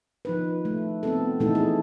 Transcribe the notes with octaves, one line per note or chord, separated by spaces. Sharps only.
F3 D#4 B4
A3
B3 C4 A4
A#2 E3 A3 D#4 E4 A4
G#4